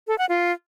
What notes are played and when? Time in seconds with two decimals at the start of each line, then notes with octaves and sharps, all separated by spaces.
0.08 A4
0.18 F#5
0.29 F4